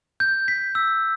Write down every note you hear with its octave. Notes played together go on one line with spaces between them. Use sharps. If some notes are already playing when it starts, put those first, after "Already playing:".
G6
B6
E6